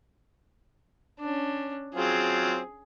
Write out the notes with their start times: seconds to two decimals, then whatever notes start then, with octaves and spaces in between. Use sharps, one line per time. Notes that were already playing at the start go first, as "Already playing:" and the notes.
1.20 C#4 D4
1.95 F#3 C4 F4 G#4